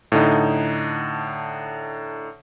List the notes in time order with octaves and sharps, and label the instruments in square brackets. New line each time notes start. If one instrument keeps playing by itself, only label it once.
[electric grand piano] A2 D3 D#4